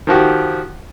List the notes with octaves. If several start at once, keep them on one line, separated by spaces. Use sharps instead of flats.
D#3 F3 F#4 G4